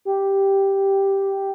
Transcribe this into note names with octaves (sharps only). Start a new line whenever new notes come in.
G4